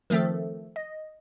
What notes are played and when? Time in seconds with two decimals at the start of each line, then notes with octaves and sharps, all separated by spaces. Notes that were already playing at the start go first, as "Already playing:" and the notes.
0.10 D#3 F3 A3 C4 A4
0.76 D#5